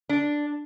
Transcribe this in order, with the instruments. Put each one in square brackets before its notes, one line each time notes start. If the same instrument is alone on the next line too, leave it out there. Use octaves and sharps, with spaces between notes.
[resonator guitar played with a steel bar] D4